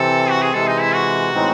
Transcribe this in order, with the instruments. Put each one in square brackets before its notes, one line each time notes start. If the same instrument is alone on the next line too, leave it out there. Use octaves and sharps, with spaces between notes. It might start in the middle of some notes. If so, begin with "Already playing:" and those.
Already playing: [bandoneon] C3 E3 C4 [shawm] A4
[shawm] F#4
G#4
[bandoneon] C3 E3 G#3 [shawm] A4
[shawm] D#4
E4
F#4
[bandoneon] A2 E3 G#3 C4 D#4